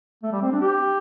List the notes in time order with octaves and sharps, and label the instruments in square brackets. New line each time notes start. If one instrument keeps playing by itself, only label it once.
[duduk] A3
G3
C4
D4
G4